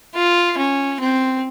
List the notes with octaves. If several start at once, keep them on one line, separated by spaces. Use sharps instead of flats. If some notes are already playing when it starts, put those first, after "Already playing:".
F4
C#4
C4